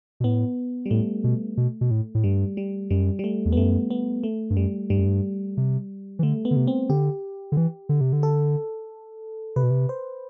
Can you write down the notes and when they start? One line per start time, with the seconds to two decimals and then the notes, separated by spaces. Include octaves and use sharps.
0.20 B2
0.24 A2 B3
0.86 G3
0.90 A2 A3
1.24 B2
1.57 B2
1.81 B2
1.91 A2
2.15 A2
2.24 G2 G3
2.57 G3
2.90 F#2 G3
3.19 G3
3.24 A3
3.45 E2
3.52 B3
3.57 F#2 A3
3.91 B3
4.23 A3
4.50 G2
4.56 F#2 G3
4.90 G2 G3
4.98 F#2
5.05 G2
5.57 C3
6.19 E3
6.23 D3 A3
6.45 B3
6.51 D3
6.56 C3
6.67 C4
6.89 D3 G4
7.52 D3
7.57 E3
7.89 D3
8.01 C3
8.13 D3
8.23 A4
9.56 C3 B4
9.63 B2
9.70 C3
9.89 C5